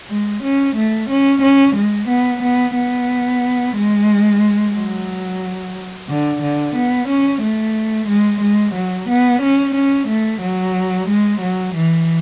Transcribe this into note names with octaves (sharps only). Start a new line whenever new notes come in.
G#3
C#4
A3
C#4
C#4
G#3
B3
B3
B3
G#3
F#3
D3
D3
B3
C#4
A3
G#3
G#3
F#3
B3
C#4
C#4
A3
F#3
G#3
F#3
E3